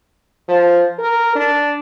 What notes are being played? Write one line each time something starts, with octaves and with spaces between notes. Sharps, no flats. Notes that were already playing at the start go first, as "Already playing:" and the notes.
F3
A#4
D4